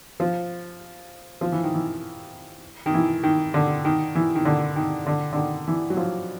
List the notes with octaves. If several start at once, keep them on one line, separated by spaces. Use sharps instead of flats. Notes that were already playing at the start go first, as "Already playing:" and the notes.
F3
F3
E3
D#3
E3
D#3
E3
D#3
D3
D#3
E3
D#3
D3
D#3
D3
D3
D#3
E3
F#3
F3